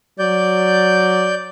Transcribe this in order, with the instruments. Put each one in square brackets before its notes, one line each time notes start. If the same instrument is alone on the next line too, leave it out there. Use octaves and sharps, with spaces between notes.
[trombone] F#3 [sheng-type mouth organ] D5 G6